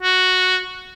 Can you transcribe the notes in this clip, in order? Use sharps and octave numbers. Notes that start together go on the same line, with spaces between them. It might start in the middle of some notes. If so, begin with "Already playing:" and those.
F#4